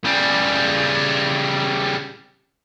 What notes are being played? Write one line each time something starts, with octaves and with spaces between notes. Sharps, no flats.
C#3 G3